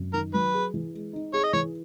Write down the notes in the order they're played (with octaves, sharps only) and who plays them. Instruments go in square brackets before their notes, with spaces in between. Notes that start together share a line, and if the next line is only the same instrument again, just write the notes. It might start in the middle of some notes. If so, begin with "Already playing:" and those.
Already playing: [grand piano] F#2
[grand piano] D#3 [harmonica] A#4
[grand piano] F#3 [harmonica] B4
[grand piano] G#4
E3
G#3
D#4
[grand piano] G#4 [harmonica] C#5
[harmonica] D#5
[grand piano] E3 [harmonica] C#5